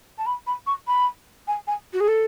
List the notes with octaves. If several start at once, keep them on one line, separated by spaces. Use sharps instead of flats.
A5
B5
B5
C#6
B5
G#5
G#5
F#4
G#4
A4